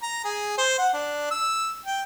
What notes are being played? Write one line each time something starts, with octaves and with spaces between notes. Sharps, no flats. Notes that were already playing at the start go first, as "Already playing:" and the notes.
A#5
G#4
C5
F#5
D4
E6
G5